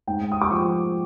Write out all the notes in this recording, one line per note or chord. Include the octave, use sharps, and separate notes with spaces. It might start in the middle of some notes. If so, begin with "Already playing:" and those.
G#2 G5
D#6
D6
F3 C#6